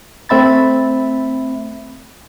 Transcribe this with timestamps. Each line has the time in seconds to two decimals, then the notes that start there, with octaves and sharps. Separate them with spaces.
0.29 A3 C4 E5 B5 A6